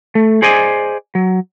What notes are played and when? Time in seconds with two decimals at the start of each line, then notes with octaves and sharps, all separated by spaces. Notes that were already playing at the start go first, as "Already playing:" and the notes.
0.15 A3
0.42 G#4 C5 D5 D#5 G#5
1.15 F#3